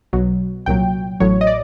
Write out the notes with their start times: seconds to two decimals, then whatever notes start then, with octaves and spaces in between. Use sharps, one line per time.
0.13 B1 B2 F#3
0.66 C2 A#2 F#3 G5
1.20 A1 A2 F#3 C#5
1.41 D#5
1.47 D5